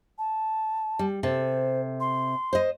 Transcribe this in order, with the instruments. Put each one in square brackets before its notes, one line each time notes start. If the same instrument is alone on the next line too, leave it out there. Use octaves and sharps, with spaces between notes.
[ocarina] A5
[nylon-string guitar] G3
[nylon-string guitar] C3 A4 [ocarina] C5
[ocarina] C6
[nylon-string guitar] C5 D#5